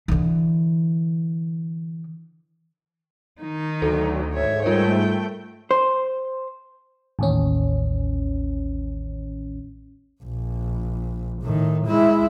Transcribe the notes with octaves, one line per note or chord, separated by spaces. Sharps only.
D3 E3
D#3 D#4
D2 F#3 A4
G#2 C#5 E5
G3 A3 F4 A#4 G5
C5
A1 D#2 C#4
A#1
A2 D#3
G#3 E4